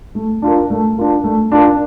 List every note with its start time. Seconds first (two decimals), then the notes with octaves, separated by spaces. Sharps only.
0.15 A3
0.42 D4 F4 A#4
0.70 A3
0.97 D4 F4 A#4
1.24 A3
1.52 D4 F4 A#4